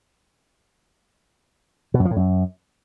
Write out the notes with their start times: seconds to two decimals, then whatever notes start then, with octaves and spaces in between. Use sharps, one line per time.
1.94 B2
2.00 F#2
2.05 F3
2.11 A2
2.16 F#2